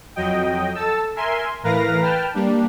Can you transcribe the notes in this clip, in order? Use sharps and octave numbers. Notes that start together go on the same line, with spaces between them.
F2 F#3 D#5 G5
A4 A5 E6
A#4 E5 G#5 C6
A2 E3 A#4 B4 F5 A#6
B4 G5 A5 F6
G3 A#3 D4